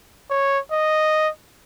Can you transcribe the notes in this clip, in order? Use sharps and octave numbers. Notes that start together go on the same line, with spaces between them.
C#5
D#5